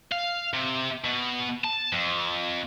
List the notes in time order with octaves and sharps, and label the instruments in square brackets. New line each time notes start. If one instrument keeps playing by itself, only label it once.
[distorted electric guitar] F5
C3
B2
A5
F2